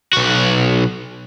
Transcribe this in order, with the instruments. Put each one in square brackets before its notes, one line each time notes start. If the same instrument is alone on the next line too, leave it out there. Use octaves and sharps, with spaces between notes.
[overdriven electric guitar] B1 F#4